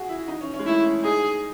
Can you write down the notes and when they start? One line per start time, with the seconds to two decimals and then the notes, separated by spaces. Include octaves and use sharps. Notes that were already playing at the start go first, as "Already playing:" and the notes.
Already playing: F#4 G#4
0.09 E4
0.28 D#4
0.41 C#4
0.54 C#4
0.59 G#3
0.65 A3 E4
0.84 C#4
1.03 D#4 G#4